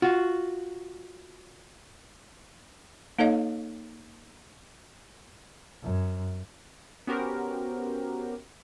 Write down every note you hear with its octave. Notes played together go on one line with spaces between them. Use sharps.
F4 F#4
A#3 D#4 A4 C#5 D#5 F5
F#2
B3 C#4 F#4 G4 A#4 C5